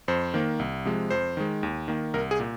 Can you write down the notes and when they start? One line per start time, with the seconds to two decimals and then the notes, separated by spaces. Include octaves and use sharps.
0.08 F2 C5
0.34 D#3 A#3
0.59 C2
0.85 C3 F3 G#3
1.11 F2 C5
1.37 D#3 G#3
1.63 D#2
1.88 D#3 A#3
2.14 C2 A#4
2.31 G#4
2.40 A#2